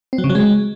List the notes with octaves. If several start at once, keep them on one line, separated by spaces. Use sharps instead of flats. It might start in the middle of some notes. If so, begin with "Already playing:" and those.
C4
F#3
C#3
F#3
G#3